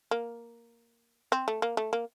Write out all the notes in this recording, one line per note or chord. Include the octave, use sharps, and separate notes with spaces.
A#3
C4
A3
A#3
A3
A#3